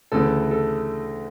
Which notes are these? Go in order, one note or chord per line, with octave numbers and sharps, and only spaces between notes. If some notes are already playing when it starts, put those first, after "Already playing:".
D2 C#3 E3 A4
A4